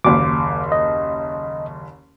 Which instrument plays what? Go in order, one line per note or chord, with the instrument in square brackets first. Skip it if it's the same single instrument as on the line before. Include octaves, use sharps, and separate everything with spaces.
[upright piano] F#1 D#2 [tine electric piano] D6
[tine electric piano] D#5